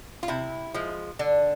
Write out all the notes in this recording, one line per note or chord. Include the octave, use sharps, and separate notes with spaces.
F4
C3 E4
F3 G#3
D3 D4